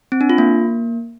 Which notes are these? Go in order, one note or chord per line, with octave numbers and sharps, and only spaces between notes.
C4
D4
F4
A#3